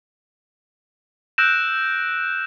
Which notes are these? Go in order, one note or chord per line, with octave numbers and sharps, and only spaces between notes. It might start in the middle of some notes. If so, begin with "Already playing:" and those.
E6 F#6 G6 A#6 D7 E7